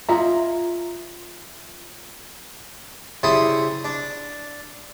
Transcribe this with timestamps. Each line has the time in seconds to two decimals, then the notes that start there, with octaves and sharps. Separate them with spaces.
0.09 F4 E5 A#5
3.23 C#3 G3 E4 C5 D#6
3.84 D4